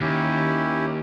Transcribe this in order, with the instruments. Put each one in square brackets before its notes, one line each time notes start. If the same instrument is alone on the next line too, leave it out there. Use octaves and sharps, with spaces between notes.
[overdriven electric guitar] D#2 [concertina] C#4 E4 G4